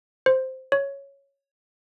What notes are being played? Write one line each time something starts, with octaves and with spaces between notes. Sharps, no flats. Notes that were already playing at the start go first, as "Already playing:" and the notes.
C5
C#5